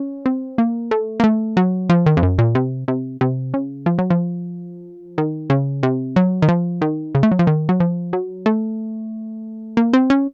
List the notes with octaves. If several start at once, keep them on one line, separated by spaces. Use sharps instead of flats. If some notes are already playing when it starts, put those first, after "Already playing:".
Already playing: C#4
C4
A#3
A3
A#3
A3
F#3
F3
D#3
F2
F#2
A#2
C3
C3
C3
C#3
F3
F#3
F3
D#3
C#3
C3
F#3
D#3
F3
D#3
C#3
A3
F#3
F3
D#3
F#3
F3
F#3
A3
A#3
C4
C#4